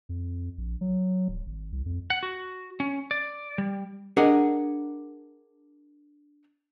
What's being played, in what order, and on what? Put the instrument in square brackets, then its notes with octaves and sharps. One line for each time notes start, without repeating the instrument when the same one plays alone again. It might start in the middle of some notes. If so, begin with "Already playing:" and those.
[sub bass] F2
A#1
F#3
D1
G#1
C2
F2
[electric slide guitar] F#5
F#4
C#4
D5
G3
[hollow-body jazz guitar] D4 G#4 A#4 D#5 F#5